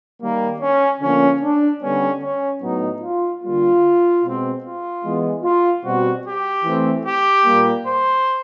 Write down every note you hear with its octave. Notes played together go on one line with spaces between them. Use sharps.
D#3 G3 A#3
C#4
D3 F3 A#3 C#4
D4
D3 G3 B3 C#4
C#4
A2 F#3 B3 D#4
F4
D3 G3 A#3 F4
B2 G#3 C4
F4
E3 G#3 B3
F4
B2 G3 C4 F#4
G4
E3 A3 C4
G4
A#2 G3 A#3
C5